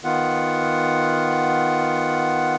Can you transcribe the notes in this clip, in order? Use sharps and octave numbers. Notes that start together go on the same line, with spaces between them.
D#3 B3 F4 F#5